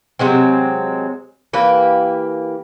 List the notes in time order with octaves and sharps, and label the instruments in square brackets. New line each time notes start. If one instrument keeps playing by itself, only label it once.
[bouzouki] C3 F#3 G#3 C4
E3 A#3 G4 B4